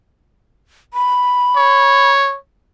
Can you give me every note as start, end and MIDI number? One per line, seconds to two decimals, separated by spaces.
0.94 2.11 83
1.56 2.37 73